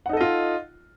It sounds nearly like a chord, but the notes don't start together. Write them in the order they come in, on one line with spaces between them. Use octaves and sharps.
F#5 D#4 A4 D#5 F4